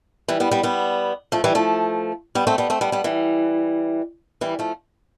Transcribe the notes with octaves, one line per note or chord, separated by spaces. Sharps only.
E3 G3
G3 B3
G3 B3
G3 B3
F3 A3
E3 G3
F3 A3
G3 B3
A3 C4
G3 B3
A3 C4
G3 B3
G3 B3
E3 G3
E3 G3
F3 A3